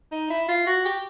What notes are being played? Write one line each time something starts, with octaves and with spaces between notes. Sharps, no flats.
D#4
E4
F4
F#4
G4